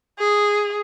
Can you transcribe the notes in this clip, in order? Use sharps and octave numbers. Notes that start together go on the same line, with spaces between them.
G#4